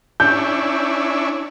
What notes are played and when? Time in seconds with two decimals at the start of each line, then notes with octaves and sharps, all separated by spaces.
0.20 C#4 D4 E4 G6